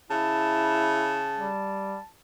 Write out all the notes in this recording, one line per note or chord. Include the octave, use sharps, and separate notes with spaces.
C#3 E4 A5
G3